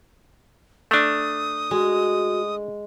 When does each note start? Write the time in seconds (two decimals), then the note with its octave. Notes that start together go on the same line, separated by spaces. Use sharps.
0.91 A3 D4 D#6
1.71 G#3 F#4